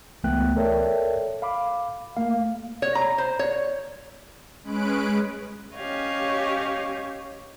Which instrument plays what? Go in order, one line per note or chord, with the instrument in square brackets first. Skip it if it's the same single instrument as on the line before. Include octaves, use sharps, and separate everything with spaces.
[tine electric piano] C#2 E3 A3 B3 G5 F#6
A4 A#4 C#5 D5 E5 G5
F5 B5 D6
A3 A#3 F5
[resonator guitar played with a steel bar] C#5
A#5
C5
C#5
[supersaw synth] G#3 C#4 B4 F#6 D7
[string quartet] C#4 G4 C#5 D#5 F5